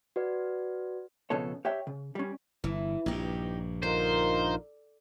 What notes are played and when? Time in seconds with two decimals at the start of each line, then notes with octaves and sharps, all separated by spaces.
0.16 F#4 B4 D5
1.30 B1 F2 C#3 B3 A4 C#5
1.65 G4 C#5 E5 G5
1.87 C#3
2.15 G3 C#4
2.64 G1 E3
3.06 A#1 G2 D#4 G4
3.83 D3 D#4 F4 A#4 C5